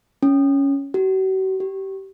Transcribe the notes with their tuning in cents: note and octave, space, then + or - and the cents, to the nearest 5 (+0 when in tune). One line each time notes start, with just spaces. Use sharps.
C#4 +5
F#4 +45
G4 -25